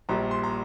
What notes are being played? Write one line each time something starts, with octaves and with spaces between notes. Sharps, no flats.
A#1 A#2 G3 A#5
C6
A#5